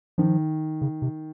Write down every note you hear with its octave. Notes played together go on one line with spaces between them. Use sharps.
D#3 F3
C#3
C3